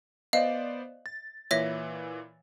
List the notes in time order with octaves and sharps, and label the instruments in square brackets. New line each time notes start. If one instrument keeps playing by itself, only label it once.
[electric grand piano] B3 C5 D5 [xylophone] D#5 F5
[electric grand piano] A6
[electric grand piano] A#2 E3 [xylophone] C#5 E5 A#6